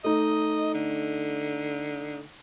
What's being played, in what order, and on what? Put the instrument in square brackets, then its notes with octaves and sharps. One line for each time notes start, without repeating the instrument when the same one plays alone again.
[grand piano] A3 D#4 [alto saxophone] D#5
[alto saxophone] D3